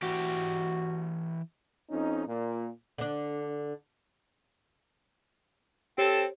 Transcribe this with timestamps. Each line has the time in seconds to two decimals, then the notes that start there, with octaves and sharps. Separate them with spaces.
0.02 E3 F#4 G4
1.90 F2 C#4 D#4
2.27 A#2
2.98 D3 D4
5.98 C4 G4 A4 C5 C#5